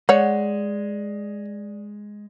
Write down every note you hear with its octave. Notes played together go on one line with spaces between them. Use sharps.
G#3 C#5 D5 F#5